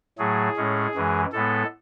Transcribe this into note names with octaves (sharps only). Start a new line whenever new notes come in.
A2 F#3 A3 G#4
A2 G#3 C#4
F#2 E3 G#3
A2 G#3 B3 A4